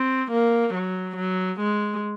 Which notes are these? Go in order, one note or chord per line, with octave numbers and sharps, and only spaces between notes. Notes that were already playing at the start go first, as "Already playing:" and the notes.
Already playing: C4
A#3
F#3
F#3
G#3